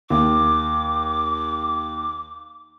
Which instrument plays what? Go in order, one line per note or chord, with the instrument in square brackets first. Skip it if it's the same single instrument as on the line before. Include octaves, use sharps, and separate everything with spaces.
[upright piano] D#2 [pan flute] D6